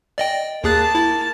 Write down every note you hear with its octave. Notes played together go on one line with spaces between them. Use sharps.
D5 D#5 G5
D#2 A#3 G#4 A5 F#6
E4